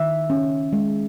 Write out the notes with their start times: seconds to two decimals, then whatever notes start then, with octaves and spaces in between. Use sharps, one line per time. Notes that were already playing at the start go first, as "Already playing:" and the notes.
Already playing: D#3 E5
0.30 C#4
0.73 G#3